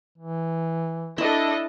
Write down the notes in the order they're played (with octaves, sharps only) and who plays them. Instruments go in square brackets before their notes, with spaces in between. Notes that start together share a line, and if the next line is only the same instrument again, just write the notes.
[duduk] E3
[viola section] D4 A4 D#5 [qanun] E4